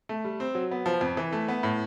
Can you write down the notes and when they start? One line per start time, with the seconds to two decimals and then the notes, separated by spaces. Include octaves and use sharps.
0.09 A3
0.24 G3
0.40 C4
0.55 F#3
0.71 B3
0.86 F3
1.01 F2
1.17 E3
1.33 A3
1.48 B3
1.63 A2